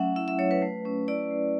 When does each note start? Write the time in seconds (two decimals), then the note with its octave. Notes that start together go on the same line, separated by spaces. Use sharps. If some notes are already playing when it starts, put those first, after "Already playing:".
Already playing: F#3 A3 C#4 E5 F#5
0.16 E4 E5
0.28 E5
0.39 F#3 C#5
0.51 B4
0.62 A3
0.85 C#4
1.08 E4 D5
1.31 A3